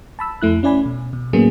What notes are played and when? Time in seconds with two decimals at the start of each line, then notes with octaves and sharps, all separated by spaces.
0.19 A5 B5 E6
0.42 F2 A3 E4 F#6
0.63 C#4 E4 D5 G#5 B5
0.86 B2
1.13 B2
1.33 A2 F#3 A#3 B3 C#4 G#4